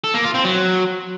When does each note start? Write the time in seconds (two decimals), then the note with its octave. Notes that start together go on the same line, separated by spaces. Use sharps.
0.04 A4
0.14 A#3
0.24 F4
0.34 C4
0.45 F#3